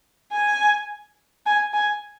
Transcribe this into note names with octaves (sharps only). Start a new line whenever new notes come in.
G#5
G#5
G#5